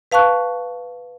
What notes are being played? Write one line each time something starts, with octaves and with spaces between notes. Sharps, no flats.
B4 F5 A5 C#6 F#6